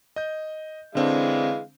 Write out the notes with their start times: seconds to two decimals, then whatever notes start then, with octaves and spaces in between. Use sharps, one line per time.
0.16 D#5 G6
0.95 D3 E3 G#3 C4 D4 F5